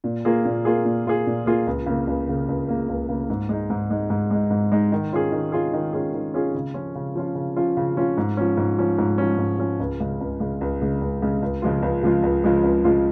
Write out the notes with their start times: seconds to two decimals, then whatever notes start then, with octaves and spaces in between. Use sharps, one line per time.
0.04 A#2
0.25 A#3 F4 G#4
0.45 A#2
0.65 A#3 F4 G#4
0.85 A#2
1.05 A#3 F4 G#4
1.27 A#2
1.46 A#3 F4 G#4
1.67 C#2
1.86 C#3 A#3
2.07 C#2
2.28 C#3 A#3
2.49 C#2
2.68 C#3 A#3
2.89 C#2
3.09 C#3 A#3
3.30 G#2
3.49 G#3 D#4
3.70 G#2
3.90 G#3 D#4
4.10 G#2
4.31 G#3 D#4
4.51 G#2
4.72 G#3 D#4
4.92 D#3
5.13 C#4 F4 G#4
5.32 D#3
5.52 C#4 F4 G#4
5.74 D#3
5.93 C#4 F4 G#4
6.14 D#3
6.34 C#4 F4 G#4
6.54 C#3
6.74 F3 C#4 F4
6.95 C#3
7.15 F3 C#4 F4
7.35 C#3
7.56 F3 C#4 F4
7.77 C#3
7.96 F3 C#4 F4
8.17 G#2
8.37 F3 C#4
8.57 G#2
8.78 F3 C#4
8.99 G#2
9.18 F3 C#4
9.38 G#2
9.59 F3 C#4
9.80 C#2
10.00 C#3 G#3
10.21 C#2
10.40 C#3 G#3
10.61 C#2
10.82 C#3 G#3
11.01 C#2
11.22 C#3 G#3
11.42 C#2
11.62 C#3 F3 G#3 F4
11.82 C#2
12.03 C#3 F3 G#3 F4
12.23 C#2
12.44 C#3 F3 G#3 F4
12.64 C#2
12.84 C#3 F3 G#3 F4